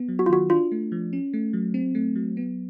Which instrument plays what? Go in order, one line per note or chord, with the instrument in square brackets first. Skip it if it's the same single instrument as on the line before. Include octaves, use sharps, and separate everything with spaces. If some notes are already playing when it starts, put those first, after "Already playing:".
Already playing: [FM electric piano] B3
F#3
[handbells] F#4
F4
[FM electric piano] D#3 [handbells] F#4
[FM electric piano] D4 [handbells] F4
[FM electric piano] A3
F3
C#4
A3
F#3
C4
A3
F#3
B3